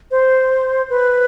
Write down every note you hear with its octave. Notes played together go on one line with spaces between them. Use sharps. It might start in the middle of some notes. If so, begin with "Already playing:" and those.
C5
B4